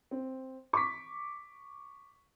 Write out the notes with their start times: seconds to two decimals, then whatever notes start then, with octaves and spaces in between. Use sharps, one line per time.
0.11 C4
0.73 C#6 D6 B6